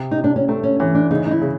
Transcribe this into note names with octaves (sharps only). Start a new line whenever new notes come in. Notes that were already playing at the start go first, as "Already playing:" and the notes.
Already playing: C3
D#4
C3
D4
C#4
A3 C4
C#4
E3 C#4
D4
C#3 D#4
D#4
E4
C#3